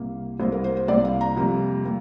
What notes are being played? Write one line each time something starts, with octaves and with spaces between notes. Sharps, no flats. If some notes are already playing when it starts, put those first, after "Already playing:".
Already playing: C2 C3 A#3
C2 C3 A#3 C5
A#4
C5
C5
C2 C3 A#3 D5
F5
A#5
F2 C3 G3 A#3
G3 A#3